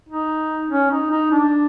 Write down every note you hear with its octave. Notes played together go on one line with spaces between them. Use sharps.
D#4
C#4
D#4
D#4
D4